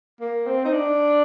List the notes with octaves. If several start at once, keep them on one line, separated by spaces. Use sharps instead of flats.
A#3
C4
D#4
D4